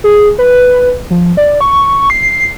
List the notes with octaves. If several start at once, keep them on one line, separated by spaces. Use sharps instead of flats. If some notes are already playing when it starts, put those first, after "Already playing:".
G#4
B4
F3
D5
C#6
C7